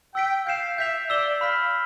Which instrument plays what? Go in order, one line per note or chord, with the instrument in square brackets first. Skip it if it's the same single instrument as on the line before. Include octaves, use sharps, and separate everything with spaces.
[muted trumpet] G5 [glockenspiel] E6 B6 D7
[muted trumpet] F5 [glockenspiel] G6 C7 E7
[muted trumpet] E5 [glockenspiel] G6 B6 F7
[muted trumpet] D5 [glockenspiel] E6 B6 E7 G7
[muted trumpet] F5 [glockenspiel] B5 F6 B6